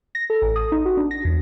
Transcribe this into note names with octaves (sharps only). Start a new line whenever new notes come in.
A#6
A4
A1
D#6
D#4
F#4
D4
A#6
E2